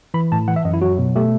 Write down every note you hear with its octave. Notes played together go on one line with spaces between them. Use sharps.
E3 B5
A2 A5
E3 F#5
E5
F#2 D#5
E4
F#3 F#4
B2
A3 G4